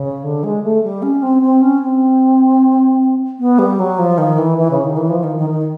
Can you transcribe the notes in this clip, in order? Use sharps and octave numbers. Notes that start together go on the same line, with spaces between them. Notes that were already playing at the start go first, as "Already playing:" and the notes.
Already playing: C#3
D3
G#3
A3
G3
C#4
C4
C4
C#4
C4
B3
G3
F#3
F3
D#3
E3
E3
C#3
D#3
E3
F3
D#3
D#3
D#3